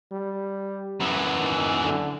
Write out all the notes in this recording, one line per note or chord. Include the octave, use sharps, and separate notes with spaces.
G3
F#2 E3
D#3
D3